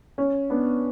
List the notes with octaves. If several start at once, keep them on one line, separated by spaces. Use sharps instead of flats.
C#4
B3 D4